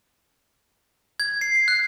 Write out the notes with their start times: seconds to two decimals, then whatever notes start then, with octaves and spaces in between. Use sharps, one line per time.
1.20 G#6
1.41 C7
1.68 F#6